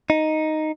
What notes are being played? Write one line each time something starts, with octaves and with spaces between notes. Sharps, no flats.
D#4